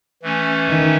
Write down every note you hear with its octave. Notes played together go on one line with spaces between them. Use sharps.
E3 A3 C#4
D#3